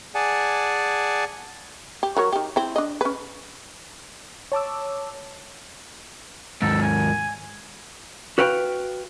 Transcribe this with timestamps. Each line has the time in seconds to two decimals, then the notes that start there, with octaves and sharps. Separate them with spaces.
0.15 G#4 D5 F#5 G#5 A5
2.03 G4
2.17 F#3 A#4 C#5
2.33 D#3 G4
2.56 C4 E4
2.76 D4 D#5
3.01 C#4 B4
4.52 C#5 A5 D6 E6
6.62 D#2 G#2 A4
6.82 G#5
8.38 F#4 B4 F5 G5